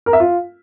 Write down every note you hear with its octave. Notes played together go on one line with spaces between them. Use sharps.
A#4
E5
F4